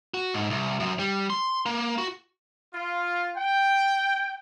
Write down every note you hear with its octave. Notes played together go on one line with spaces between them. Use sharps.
F#4
G#2
C2
F#2
G3
C6
A#3
F#4
F4
G5